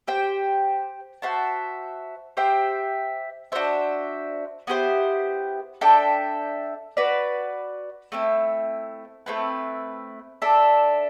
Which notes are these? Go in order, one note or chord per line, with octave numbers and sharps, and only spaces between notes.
G4 C5 G5
F#4 C5 E5 A5
G4 C5 E5 G5
D4 F#4 C5 E5
B3 E4 G4 C5
D4 A4 E5 G5
F#4 B4 D5
A3 C4 E4
A3 C4 E4 B4
D4 A4 E5